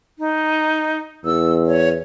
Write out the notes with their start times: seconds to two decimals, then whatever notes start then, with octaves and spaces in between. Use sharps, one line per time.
0.19 D#4
1.25 E2 E6
1.66 C#5